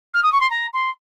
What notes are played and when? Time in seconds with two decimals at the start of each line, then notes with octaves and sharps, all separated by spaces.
0.14 F6
0.23 D#6
0.32 C#6
0.41 C6
0.50 A#5
0.73 C6